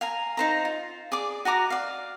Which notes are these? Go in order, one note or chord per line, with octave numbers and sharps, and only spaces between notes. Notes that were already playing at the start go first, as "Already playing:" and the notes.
F5 G#5 A#5
D#4 C5 A#5
F4
G#4 D5 D6
F#4 G#5 A#5 D6
D5 F5